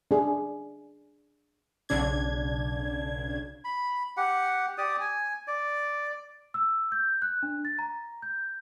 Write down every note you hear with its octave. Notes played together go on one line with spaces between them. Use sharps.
D4 G#4
B1 C#3 D4 G#6
B5
G4 F#5
G4 D5 D#6
G#5
D5
E6
G6
F#6
D4
A6
A#5
G6